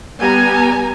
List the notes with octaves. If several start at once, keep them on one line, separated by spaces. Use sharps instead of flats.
G3 B3 G#5 A#5